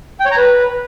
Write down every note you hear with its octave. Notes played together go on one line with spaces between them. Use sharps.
G5
C#5
A#5
B4